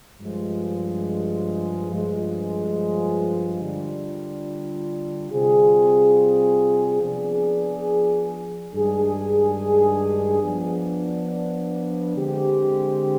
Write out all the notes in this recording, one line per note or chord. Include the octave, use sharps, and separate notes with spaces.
G2 F3 G#3
G2 F3 G#3
D3 G3 D4 F4
C3 G3 C4 F4 G#4
F3 B3 D4 G#4
G2 D#3 G#3 D4 G#4
F3 B3 D4
D3 G#3 C4 G4